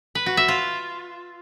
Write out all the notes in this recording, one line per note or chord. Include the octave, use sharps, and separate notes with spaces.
B4
F#4
E5
F4